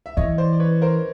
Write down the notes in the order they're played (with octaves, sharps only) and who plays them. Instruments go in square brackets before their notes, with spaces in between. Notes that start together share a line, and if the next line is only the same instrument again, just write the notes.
[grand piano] E5
[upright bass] E3 [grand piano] C#5 D#5
[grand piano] C5 D5
D5
B4 C#5
A#4 C5